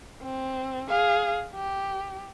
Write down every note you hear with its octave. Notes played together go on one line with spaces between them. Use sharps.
C4
G#4 F5
G4